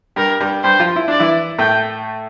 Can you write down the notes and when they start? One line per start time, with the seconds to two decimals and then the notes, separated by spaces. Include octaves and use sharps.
0.16 G2 G3 A#4
0.40 G2 G3
0.64 G2 G3 C5
0.80 F3 F4
0.96 E4
1.08 D4 D5
1.20 E3 E4
1.59 A2 A3 G5